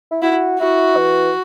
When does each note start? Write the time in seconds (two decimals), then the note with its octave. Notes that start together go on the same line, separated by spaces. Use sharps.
0.11 E4
0.22 E4 F#4
0.60 E4 F#4
0.97 E3